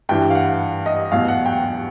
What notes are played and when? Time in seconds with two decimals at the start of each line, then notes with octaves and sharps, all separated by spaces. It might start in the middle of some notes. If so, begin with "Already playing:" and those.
0.09 G2 E3 G3 G5
0.30 F5
0.35 F#5
0.86 D#5
1.11 E2 B2 F#3 F5
1.28 F#5
1.46 G5